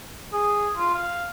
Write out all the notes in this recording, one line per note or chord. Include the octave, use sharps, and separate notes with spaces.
G#4
F4
F5